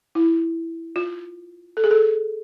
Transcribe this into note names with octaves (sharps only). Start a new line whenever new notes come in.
E4
F4
A4
G#4
A4